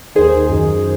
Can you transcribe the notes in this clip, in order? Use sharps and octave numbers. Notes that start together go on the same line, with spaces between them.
D#2 D#3 G#4 C5
F#2 D#3